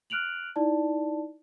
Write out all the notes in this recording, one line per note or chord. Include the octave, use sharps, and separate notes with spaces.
F6 F#6 D7 F7 F#7
D#4 E4 D5 A5